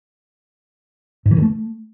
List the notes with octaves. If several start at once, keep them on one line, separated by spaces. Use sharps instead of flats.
G#2
E3
D#3
A3